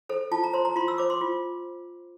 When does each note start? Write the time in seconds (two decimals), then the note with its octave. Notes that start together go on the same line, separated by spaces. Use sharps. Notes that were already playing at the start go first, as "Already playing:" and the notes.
0.09 A4 C5
0.31 F4 A5
0.44 A#5
0.54 C5 C6
0.65 A#5
0.76 F4 C6
0.88 E6
0.98 C5 D6
1.10 C6
1.21 F4